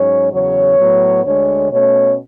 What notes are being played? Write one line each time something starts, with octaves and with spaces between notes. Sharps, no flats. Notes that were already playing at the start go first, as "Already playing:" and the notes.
Already playing: G#2 F#3 C#4 C#5
E2 C#3 F#3 C#5
A2 F#3 B3
D2 D3 G#3 C#5
B2 A3 C#4 C#5